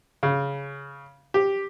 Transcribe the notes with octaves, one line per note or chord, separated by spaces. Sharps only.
C#3
G4